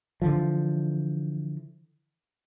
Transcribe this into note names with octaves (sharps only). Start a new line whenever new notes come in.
D3 E3 F3